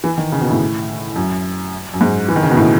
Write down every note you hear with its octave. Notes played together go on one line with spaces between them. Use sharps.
E3
D#3
C#3
B2
A2
F#2
F#2
G#2
E3
D#3
C#3
B2
A2